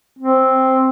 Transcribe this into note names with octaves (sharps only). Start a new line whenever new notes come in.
C4